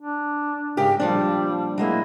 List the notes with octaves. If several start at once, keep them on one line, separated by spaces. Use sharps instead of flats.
D4
G#2 C#3 G4 A#4
A#2 F3 G3 D4
F#3 G#3 A#3 E4